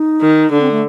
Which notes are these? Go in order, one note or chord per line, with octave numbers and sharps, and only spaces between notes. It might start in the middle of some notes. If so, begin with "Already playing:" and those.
Already playing: D#4
D#3
D3 D4
C4
A3